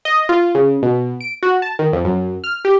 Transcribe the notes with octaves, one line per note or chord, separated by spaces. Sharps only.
D#5
F4
C#3
B2
D7
F#4
A5
D#3
F2
F#2
F6
G4